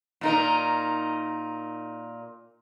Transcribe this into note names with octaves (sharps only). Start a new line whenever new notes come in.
A#2 D#4 A#4